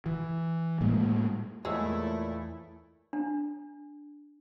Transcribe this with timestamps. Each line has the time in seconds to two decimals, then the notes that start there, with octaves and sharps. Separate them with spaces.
0.06 E3
0.81 A2 G3 G#3 A#3
1.65 E2 A#2 G#3 A3 E4 C#5 E6
3.13 D4